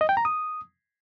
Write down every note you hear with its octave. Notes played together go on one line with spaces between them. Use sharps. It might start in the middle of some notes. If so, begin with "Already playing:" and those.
D#5
G5
A#5
D#6